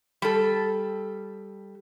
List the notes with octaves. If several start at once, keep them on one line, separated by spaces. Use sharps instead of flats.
G3 A4